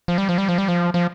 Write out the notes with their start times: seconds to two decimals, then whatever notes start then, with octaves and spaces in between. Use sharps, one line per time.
0.08 F3
0.18 G3
0.29 F3
0.38 G3
0.49 F3
0.58 G3
0.68 F3
0.94 F3